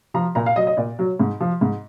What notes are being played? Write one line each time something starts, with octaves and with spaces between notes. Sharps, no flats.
F3 A#5
A#2 A#5
F5
F#3 D#5
D#5
A#2 D5
F#3
G#2
F3
G#2